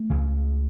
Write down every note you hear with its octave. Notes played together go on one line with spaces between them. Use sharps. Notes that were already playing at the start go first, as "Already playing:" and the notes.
Already playing: A3
C#2 C#3